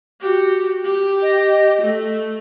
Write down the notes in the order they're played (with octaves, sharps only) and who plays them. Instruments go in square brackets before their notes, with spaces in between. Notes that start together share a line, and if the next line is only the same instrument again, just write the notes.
[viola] F#4 G4
G4
[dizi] D#5
[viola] A3